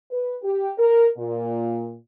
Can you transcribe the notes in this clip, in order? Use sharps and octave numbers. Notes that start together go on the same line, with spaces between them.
B4
G4
A#4
A#2